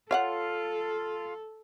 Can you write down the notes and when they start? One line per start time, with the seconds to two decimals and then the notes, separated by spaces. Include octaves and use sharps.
0.11 F4 A4 C#5 F5 F#5